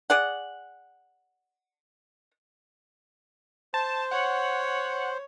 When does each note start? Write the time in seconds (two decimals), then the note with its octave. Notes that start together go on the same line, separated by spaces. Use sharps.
0.10 G#4 D5 F#5
3.74 C5 A5
4.11 C#5 F#5